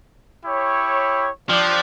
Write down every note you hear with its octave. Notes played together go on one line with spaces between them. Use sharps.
E4 G4 C#5
F3 D4 G4 D5